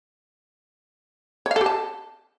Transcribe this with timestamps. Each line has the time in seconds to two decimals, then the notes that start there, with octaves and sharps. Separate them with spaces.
1.46 C#5
1.51 F5
1.56 A4
1.61 G4
1.66 A5